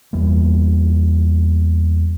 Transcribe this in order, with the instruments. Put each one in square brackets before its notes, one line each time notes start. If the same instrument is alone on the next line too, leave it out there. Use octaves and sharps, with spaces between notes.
[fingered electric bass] E2 G3 A#3